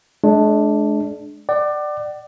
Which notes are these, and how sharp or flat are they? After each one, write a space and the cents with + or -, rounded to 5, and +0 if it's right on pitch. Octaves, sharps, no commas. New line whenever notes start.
G#3 +40 D4 +0
D5 +20 F#5 +40